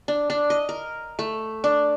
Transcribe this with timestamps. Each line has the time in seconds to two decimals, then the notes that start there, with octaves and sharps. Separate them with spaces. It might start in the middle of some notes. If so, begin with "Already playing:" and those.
0.08 D4
0.30 D4
0.50 D#5
0.69 A#4
1.19 A3
1.64 D4